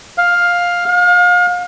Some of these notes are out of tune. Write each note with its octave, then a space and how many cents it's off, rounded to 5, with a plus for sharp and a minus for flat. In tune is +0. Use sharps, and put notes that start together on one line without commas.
F5 +10
F5 +35